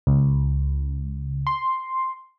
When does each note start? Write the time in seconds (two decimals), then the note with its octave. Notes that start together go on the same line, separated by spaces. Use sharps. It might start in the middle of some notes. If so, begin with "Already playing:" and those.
0.07 C#2
1.47 C6